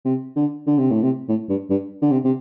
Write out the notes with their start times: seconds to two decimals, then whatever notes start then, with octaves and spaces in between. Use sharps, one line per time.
0.05 C3
0.36 D3
0.67 D3
0.78 C3
0.90 A2
1.02 C3
1.29 A2
1.49 G2
1.70 G2
2.02 D3
2.11 C3
2.24 C3